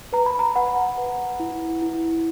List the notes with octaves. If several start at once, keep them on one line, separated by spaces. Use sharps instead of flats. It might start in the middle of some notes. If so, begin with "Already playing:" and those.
B4 A#5
B5
A#5
B4 F#5
B4
E4
E4